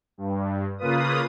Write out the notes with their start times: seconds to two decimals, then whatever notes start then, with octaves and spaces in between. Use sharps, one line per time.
0.18 G2
0.78 C#3 A#3 F4 B4 D#6